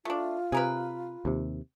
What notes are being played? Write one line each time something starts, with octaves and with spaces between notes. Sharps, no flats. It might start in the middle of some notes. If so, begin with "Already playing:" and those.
A3 D4 F4
C3 G#4 A#4 B4
D#2 C3